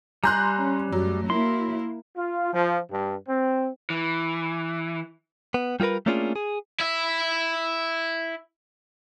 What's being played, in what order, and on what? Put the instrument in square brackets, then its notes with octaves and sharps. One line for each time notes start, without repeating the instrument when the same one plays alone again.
[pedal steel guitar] G3 G#5 G6 [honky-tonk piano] A#5 C6 F#6
[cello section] C#4
[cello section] F#2 A3 [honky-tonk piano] F#3
[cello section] A#3 E4 A#4 [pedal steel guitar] C6
[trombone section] F4
F3
G2
C4
[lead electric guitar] E3
[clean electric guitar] B3
G3 F4 G#4 A#4 B4
A3 A#3 C#4 D4 F4 G#4
G#4
[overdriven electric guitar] E4 E5